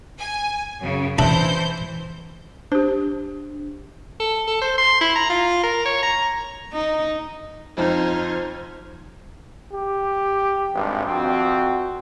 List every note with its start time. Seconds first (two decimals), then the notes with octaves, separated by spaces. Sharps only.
0.18 G#5
0.79 F#2 C#3
1.19 E3 D4 C5 E5 B5 G6
2.72 D4 G4 C5
4.20 A4
4.47 A4
4.62 C5
4.78 C6
5.01 E4
5.15 A#5
5.30 F4
5.64 A#4
5.86 C#5
6.03 A#5
6.73 D#4
7.77 F2 D#4 C5 F6 G#6
9.72 G4
10.75 G#1 G2
11.07 F2 C4 F#4